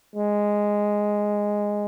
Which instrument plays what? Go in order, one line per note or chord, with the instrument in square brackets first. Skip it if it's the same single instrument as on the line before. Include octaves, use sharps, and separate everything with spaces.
[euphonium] G#3